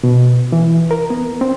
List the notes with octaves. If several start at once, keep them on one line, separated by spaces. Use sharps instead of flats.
B2
E3
A#4
B3
C4